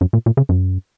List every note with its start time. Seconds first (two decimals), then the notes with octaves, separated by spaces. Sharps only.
0.01 F#2
0.13 A#2
0.26 A#2
0.37 C#3
0.49 F#2